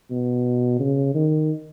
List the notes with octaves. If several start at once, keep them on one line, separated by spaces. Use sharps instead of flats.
B2
C#3
D#3